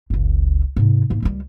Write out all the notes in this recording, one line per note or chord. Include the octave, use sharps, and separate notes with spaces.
F#1 C#2
G#2 C3
G#2 A#3
C#2 G3